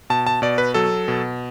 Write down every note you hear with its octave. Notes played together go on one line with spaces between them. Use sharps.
B2 A5
A5
B2 D5
B4
F#3 A4
B2